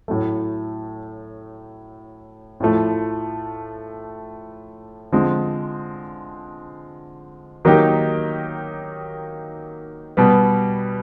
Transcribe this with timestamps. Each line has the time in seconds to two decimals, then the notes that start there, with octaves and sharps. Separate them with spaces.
0.08 A2 F#3 A3
2.60 A2 F3 A3
5.12 D3 F3 G#3 C4
7.65 D#3 F#3 A#3 D#4 G4
10.17 B2 G3 B3